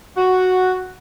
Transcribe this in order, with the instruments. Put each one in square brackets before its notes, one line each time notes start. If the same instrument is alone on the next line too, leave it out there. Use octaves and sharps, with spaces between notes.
[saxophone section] F#4